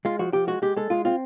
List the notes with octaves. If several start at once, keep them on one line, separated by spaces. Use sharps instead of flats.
G#3 F4
F3 F#4
F3 G4
G#3 F#4
G#3 G4
G#3 A4
G#3 F4
C4 F4